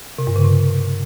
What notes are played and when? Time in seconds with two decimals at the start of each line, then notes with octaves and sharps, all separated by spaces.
0.18 C3
0.27 G2
0.36 C#3
0.45 C3